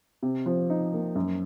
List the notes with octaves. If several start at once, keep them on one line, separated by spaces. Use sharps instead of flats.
C3
F3
D#4
A#3
F#2